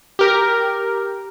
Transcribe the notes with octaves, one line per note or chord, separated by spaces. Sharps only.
G4 A#4